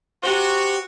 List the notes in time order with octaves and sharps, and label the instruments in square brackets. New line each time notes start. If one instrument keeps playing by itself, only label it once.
[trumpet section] F#4 [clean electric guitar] G4 C5